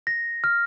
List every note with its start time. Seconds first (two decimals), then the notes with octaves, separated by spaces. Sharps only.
0.07 A#6
0.44 F6